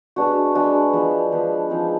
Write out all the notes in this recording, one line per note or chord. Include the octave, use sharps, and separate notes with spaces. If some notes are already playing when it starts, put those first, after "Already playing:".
G#3 B3 D4 F#4
G#3 B3 D4 F#4
F3 G#3 B3
F3 G#3 B3
F3 G#3 C4 D#4